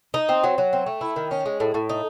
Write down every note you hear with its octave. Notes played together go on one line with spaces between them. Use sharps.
D#4
C4
F#3
F#3
C4
A3
E4
D#3
C#4
G#3
A2
A2
D#4